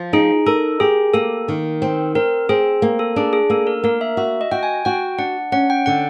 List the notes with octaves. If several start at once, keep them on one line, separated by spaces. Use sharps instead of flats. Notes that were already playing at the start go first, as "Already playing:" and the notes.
Already playing: F3
D#4 G#4
A4 A#4
G4 G#4
A#3 A4
D#3
C4
C4 A#4
C4 G#4
A#3
A4
D4 G#4
G#4
A#3 A4
A#4
A#3 A#4
E5
F#4 E5
D#5
F#4 G5
G#5
F#4 G5
D4 F#5
C#4 F#5
G5
D3 F#5